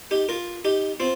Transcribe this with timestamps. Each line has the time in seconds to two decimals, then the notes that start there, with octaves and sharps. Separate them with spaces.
0.11 D#4 G4
0.29 F4 A#4
0.65 D#4 G4
1.00 C4 F4